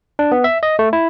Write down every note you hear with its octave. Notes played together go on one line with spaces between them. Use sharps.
D4
B3
E5
D#5
A3
E4